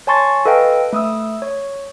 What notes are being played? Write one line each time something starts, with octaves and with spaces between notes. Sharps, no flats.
C#5 G#5 A5 C6 C#6 A6
A4 B4 D#5 F5 G5
A3 D#6 E6
C#5